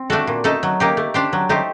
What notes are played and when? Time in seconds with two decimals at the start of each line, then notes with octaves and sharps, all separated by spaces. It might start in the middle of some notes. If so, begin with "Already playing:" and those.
Already playing: C4
0.10 A3 D4 F#4 A4
0.27 A#2
0.44 A3 D#4 A4
0.63 F#3
0.80 A#3 D#4 G4
0.97 A3
1.14 D4 G4 C5
1.33 F#3
1.49 A3 D#4 G4 C5